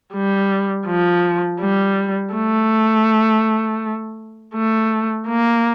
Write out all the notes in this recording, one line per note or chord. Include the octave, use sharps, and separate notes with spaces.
G3
F3
G3
A3
A3
A#3